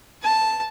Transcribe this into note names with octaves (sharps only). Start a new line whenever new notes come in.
A5